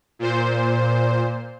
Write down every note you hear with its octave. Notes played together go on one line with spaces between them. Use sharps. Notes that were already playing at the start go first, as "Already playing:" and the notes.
A#2 C5